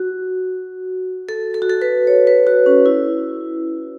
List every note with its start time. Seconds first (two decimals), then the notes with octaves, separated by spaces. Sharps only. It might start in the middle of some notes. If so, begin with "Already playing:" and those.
Already playing: F#4
1.29 A4
1.54 A4
1.62 F#4
1.70 A4
1.82 B4
2.07 C#5
2.27 B4
2.47 F#4
2.66 C#4
2.86 E4